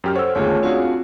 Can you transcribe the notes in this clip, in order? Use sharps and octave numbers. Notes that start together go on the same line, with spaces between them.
F#2 G4 F6
A4 C5 C#5 F#5 E6
G1 D#2 A3 C#4 F4 G#4
C4 D4 F4 F#4 G#4 F5